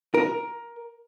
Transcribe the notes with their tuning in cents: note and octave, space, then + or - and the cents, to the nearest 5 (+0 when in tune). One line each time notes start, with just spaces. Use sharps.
A#4 +15